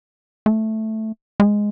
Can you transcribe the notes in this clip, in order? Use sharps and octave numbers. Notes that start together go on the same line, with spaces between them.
A3
G#3